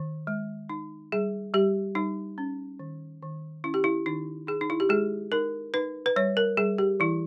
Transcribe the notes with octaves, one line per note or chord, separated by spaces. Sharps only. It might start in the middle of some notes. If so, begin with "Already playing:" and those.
Already playing: D#3
G#3
D#4
G3 G#4
G3 G4
G3 D#4
C#4
D#3
D#3
C#4 E4
G4
E4
D#3 D#4
D#4 G#4
D#4
E4
G4
G#3 G#4
D#4 A#4
D#4 B4
B4
G3 C#5
A#4
G3 G#4
G4
E3 E4